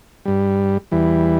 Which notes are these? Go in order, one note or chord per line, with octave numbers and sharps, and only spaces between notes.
G2 G3
E2 E3 G3